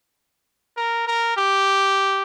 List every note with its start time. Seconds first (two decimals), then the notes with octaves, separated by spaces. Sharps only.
0.76 A#4
1.07 A#4
1.37 G4